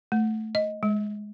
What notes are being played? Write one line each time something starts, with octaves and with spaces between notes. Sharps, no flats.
A3
D#5
G#3